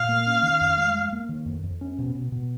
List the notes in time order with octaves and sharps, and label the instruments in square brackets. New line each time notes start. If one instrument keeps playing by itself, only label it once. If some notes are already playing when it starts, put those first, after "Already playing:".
Already playing: [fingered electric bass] A#2 [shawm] F5
[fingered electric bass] A#3
C#4
D#3
F2
G#3
G#3
A#3
D#3
F2
F2
C#4
B2
B2
B2